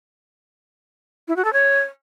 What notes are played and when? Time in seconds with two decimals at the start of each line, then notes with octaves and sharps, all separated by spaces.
1.28 E4
1.36 F#4
1.45 A4
1.53 C#5